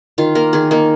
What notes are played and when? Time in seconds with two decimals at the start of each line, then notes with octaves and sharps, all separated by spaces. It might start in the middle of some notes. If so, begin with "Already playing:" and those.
0.18 D#3 F4
0.35 A#3 A#4
0.53 D#3 G#4
0.71 A#3 D#4